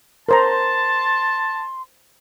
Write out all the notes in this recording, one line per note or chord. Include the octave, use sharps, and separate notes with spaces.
A#4 C5 A5 A#5 C6